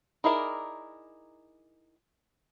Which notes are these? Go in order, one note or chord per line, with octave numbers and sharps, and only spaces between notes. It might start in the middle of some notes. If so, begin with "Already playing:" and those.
D#4 E4 G#4 A#4 D5